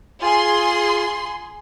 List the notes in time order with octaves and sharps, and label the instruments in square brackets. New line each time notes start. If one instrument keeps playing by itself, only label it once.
[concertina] F4 [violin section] G#4 C6